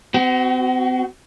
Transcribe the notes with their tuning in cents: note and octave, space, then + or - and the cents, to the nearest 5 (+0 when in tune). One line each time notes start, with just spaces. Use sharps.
C4 -40 F#4 +25